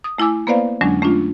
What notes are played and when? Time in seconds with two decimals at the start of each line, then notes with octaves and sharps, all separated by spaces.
0.04 D#6
0.18 A3 E4 G#5 D6 E6
0.47 A#3 B3 B4 C5 D5 F5
0.81 F2 D3 F#3 G#3 C#4 D4
1.02 A3 C#4 D4 F4